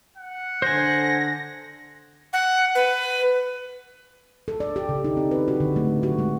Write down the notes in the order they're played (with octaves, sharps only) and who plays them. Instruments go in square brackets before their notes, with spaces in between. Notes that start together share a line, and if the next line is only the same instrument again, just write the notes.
[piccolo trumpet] F#5
[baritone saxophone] D3 [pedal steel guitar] C5 G#5 [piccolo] A#6
[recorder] F#5
B4
[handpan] A4
D5
G4
C#3
D#4
C4
B4
F#4
D3
A3
F#4
G#3